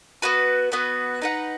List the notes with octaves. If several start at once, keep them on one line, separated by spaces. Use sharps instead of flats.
B3 F#4 B4
B3 F#4 B4
D#4 B4 F#5